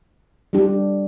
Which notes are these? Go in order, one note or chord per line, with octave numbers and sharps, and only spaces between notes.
G3 D4 G4